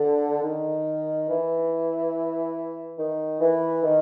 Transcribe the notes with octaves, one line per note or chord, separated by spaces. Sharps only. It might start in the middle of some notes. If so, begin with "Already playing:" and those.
Already playing: D3
D#3
E3
D#3
E3
D#3